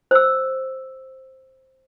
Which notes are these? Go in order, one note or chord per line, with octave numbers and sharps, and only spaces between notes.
C5 E6